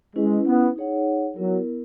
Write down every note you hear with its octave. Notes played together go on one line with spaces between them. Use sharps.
G#3 C#4 E4 B4
B3
D#4 G#4 C#5 F#5
F#3 B3 E4 A#4